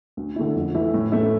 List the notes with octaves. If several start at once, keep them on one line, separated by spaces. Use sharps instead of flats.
D2
D3 A3 E4
F2
E3 A3 E4
A2
E3 A3 E4